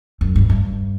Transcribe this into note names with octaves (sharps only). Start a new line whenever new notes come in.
F#2
G2
G2